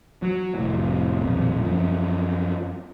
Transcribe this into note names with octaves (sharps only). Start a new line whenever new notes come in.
F#3
F1 A2
D#1 B1 F2
F#2 F3